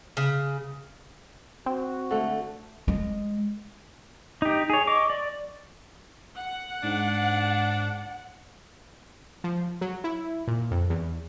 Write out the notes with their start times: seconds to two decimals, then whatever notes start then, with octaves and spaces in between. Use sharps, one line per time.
0.17 C#3
1.66 C4 F#4
2.11 D3 A3
2.88 G#3
4.42 D#4 G4
4.70 G#4 C#5
4.87 D#5 C#6 D6
5.10 D5
6.37 F#5
6.83 G#2 D4
9.44 F3
9.81 F#3
10.04 E4
10.47 A#2
10.71 F2
10.90 E2